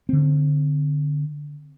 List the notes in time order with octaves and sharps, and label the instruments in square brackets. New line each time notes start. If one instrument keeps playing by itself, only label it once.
[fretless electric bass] D3 C4